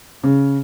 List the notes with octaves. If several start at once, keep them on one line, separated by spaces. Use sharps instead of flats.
C#3